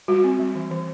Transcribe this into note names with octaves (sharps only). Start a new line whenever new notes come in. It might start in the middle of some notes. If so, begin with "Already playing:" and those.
G3 F#4
C4
G3
E3
E3